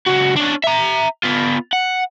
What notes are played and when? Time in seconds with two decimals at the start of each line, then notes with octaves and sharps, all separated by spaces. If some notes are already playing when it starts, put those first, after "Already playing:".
0.06 C#2 F#4
0.36 C#4 D4
0.64 E5 A#5
1.23 B3 F4
1.73 F#5